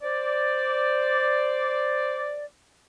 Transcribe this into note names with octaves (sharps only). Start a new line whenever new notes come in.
C5 D5